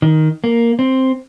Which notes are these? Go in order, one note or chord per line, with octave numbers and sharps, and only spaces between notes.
D#3
A#3
C4